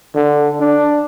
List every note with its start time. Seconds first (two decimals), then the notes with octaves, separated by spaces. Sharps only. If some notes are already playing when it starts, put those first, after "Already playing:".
0.15 D3
0.60 D4